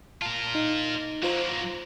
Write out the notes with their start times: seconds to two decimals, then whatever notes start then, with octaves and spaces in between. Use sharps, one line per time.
0.22 F4 A#4 A5 F6
0.55 D#4
1.23 F#3 A#3 F4 C5 A#5